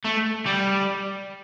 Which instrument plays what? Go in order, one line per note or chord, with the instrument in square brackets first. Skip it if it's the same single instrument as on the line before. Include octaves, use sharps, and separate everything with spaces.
[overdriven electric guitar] A3
G3